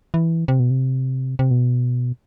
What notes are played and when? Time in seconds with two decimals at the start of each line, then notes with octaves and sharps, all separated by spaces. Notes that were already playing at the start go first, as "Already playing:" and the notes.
0.14 E3
0.48 C3
0.60 B2
0.70 C3
1.39 C3
1.51 B2